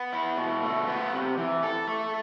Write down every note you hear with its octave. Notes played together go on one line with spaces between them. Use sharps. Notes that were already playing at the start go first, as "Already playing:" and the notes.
Already playing: B3
E4
B2
A3
B3
C3
E3
A4
A3